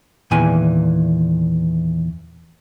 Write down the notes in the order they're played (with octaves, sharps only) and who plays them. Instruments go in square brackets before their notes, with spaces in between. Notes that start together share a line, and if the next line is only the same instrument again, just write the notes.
[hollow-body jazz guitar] E2 A#2 D#3 E3 G#5